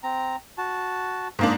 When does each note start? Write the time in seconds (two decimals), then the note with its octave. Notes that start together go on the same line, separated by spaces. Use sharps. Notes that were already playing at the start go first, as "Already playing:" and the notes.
0.03 C4 A#5
0.58 F#4 A5
1.39 G#2 A#3 D4